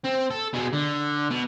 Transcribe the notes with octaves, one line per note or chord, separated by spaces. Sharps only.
C4
A4
B2 G#3
D3
B2